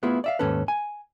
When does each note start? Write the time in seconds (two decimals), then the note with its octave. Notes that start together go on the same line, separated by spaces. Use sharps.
0.03 A3 B3 E4 F4 G#4 B4
0.24 D5 E5 F5
0.39 D#2 G#2 C#4 A4 B4
0.68 G#5